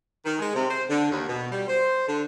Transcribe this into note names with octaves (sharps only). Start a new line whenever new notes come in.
D#3
G#3
C3
C5
D3
D#2
B2
G3
C5
D3